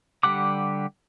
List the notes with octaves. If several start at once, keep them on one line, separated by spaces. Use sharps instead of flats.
D3 G3 G4 F#5 D6